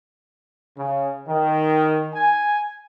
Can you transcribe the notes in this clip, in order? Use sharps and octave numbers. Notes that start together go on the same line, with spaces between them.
C#3
D#3
G#5